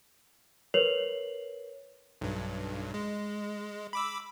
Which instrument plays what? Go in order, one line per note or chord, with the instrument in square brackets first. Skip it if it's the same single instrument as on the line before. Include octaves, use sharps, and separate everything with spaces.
[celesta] A#4 B4 C#5 C7 F7 F#7
[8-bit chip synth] B1 G2
G#3
B5 D6 E6